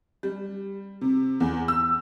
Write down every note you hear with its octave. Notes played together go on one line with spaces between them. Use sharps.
G3
C3
E2
E6